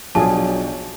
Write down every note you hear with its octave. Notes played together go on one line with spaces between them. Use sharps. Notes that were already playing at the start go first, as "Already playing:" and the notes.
B1 F3 F#3 D4 G#4 A5